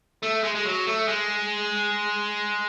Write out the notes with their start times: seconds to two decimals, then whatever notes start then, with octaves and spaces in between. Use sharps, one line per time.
0.23 A3
0.44 G#3
0.55 G#3
0.65 F#3
0.87 A3
1.08 G#3